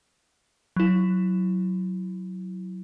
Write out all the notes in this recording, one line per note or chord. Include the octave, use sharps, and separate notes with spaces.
F#3 E4